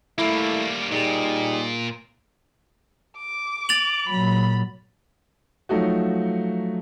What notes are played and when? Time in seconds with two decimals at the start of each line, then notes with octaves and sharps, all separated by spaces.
0.19 G3 A3 A#3 E4
0.92 A#2 G3 D#4 G#4
3.18 D6
3.69 A6 F7 F#7
4.09 A#2 F#3 B5
5.69 F3 F#3 A3 D#4 F#4